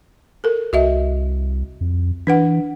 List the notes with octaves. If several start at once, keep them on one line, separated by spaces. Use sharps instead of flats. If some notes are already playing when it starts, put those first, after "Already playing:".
A4 A#4
C2 F#4 D#5 E5
F2
E3 D4 B4 F#5